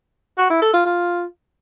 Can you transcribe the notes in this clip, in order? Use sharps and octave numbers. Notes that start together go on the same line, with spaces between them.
F#4
E4
A4
F4
F4